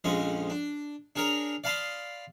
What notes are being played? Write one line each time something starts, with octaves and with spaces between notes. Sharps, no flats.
A#1 F2 G#3 C#4 D#5
D4
D4 G#4 A#4 C#5 A#5
D5 F5 A5 B5 C6 D#6